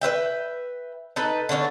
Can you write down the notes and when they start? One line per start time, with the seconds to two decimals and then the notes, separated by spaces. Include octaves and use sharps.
0.01 B4 C5 E5 G5
1.16 D#4 A4 B4
1.49 D3 A3 C#4 D4